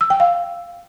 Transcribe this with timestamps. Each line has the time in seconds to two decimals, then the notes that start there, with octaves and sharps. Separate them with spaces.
0.01 E6
0.10 G5
0.20 F5